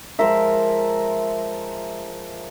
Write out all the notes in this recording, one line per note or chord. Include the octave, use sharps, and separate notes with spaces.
F3 G#3 A#4 E5